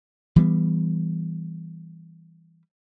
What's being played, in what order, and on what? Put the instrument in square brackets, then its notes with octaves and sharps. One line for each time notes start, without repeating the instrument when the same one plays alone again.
[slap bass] E3 G3 B3